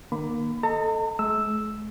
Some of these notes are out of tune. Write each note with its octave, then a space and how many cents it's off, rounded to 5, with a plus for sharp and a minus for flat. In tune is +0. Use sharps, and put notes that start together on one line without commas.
D#3 -35 A#3 +15 B5 +25
A4 +0 D#5 +0 A#5 -45
G#3 +45 E6 +0